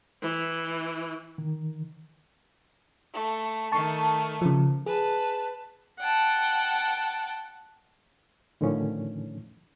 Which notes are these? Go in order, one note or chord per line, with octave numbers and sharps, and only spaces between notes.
E3
D#3
A3
D#3 A3 A5 C#6
C#3 F3
G#4 B4 A5
F#5 G5 A5
A2 D3 D#3 F3 C#4